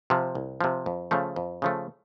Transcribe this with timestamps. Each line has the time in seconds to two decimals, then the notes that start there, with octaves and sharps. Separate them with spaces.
0.10 C3 F3
0.35 C2
0.61 C3 F3
0.86 F2
1.11 C#3 F3 A3
1.36 F2
1.62 C#3 F3 A3